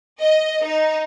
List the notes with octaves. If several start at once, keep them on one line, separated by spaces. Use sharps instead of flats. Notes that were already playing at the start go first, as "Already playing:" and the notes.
D#5
D#4